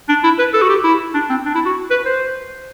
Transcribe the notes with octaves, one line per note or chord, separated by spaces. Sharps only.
D4
E4
B4
A4
F#4
G4
E4
D4
C4
D4
E4
F#4
B4
C5